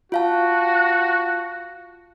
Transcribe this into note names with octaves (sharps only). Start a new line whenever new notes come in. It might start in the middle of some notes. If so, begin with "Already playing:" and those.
F4 F#4 F5 A5